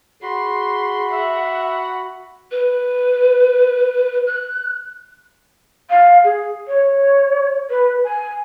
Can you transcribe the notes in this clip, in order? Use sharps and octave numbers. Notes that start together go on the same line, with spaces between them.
F#4 G#4 B5 C6
E5 F#5
B4
F#6
F5
G#4
C#5
B4
G#5